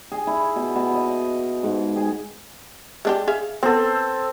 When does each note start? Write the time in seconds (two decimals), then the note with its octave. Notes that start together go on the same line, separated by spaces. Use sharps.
0.12 G#4
0.27 E4
0.56 B2
0.76 B2
0.94 D#5
1.63 G#2
1.96 G#4
3.05 G#3 D4 G4
3.28 G#4 E5 F5
3.63 B3 C4 A4